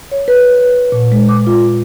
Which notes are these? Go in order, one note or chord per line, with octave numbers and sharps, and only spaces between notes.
C#5
B4
B4
A#2
G#3
D6
F4